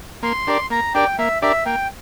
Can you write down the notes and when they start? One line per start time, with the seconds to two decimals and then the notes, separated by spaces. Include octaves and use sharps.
0.23 A#3 C6
0.47 D4 G4 A#4 D5
0.70 A#3 A#5
0.95 D4 G4 A#4 D5 G5
1.19 A#3 E5
1.42 D4 G4 A#4 D5 E5
1.66 A#3 G5